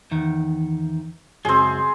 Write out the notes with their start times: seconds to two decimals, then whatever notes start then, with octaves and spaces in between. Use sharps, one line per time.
0.11 E2 D#3
1.45 C#2 F#2 F#3 C4 G#4